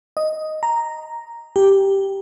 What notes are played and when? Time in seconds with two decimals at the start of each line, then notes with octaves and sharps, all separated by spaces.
0.17 D#5
0.63 A#5
1.56 G4